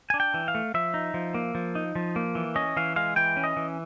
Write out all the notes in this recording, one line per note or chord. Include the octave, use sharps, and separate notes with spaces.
D4 G#5
G5
E3
F5
A3
F3 E5
D#4
F3
A#3
F3
D#4
F3
A#3
E3
C#4 D#5
E3 F5
G#3 F5
E3 G5
C#4
D#5
E3